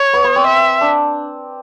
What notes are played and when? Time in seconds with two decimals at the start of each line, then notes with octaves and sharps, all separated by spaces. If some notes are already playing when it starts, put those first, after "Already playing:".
Already playing: C#5
0.13 B3
0.24 B3
0.36 C4
0.47 E5
0.81 D4